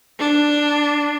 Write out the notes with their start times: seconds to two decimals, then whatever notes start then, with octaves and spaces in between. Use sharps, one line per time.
0.19 D4